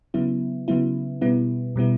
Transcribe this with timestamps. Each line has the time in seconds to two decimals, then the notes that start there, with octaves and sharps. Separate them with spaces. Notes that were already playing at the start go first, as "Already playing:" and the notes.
0.14 C#3 F#3 B3 E4
0.68 C#3 F#3 B3 E4
1.22 B2 G3 B3 E4
1.76 B2 G3 B3 E4